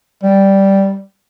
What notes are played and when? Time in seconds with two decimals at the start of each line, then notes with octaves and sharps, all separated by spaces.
0.23 G3